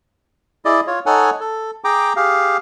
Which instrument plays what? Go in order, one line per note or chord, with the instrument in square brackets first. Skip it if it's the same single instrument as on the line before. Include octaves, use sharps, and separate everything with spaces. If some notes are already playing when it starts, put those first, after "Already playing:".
[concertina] E4 G#4 D5 D#5
F4 C#5
D#4 A4 C#5 F#5 G#5
A4
G#4 G5 A#5 D6
G4 G#4 F5